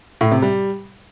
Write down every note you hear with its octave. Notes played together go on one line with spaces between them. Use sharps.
A2
C3
G3